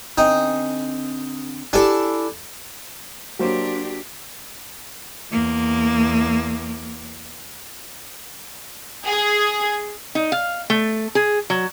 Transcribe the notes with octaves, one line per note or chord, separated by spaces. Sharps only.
D3 C4 D#4 G#5
D4 E4 G4 A4 G#5
F#3 A#3 D4 F#4 G4 C5
E2 A#3
G#4
D#4
F5
A3
G#4
F#3